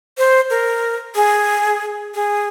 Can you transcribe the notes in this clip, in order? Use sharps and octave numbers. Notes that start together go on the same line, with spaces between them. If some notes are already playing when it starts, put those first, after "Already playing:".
C5
A#4
G#4
G#4